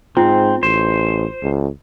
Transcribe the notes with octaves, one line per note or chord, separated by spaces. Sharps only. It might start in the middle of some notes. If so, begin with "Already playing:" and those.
G#2 C4 F4
A1 C5
C#2